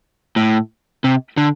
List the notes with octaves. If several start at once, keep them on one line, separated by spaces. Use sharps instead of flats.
A2
C3
D3